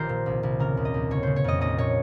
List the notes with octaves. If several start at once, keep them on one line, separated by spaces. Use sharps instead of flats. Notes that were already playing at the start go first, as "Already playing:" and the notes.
Already playing: A#1 D#3 F4 G4 A#4 C5
A#2
C2
C2
C#3 A#4
D#2
D#5
D#2
G1 C#5
C#3 C5
C#5
F2 D#5
A#1 D#5
A#2 C#5